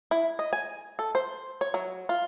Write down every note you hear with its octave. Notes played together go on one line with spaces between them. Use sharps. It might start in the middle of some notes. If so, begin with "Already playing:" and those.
E4
D#5
G#5
A4
C5
C#5
F#3
F4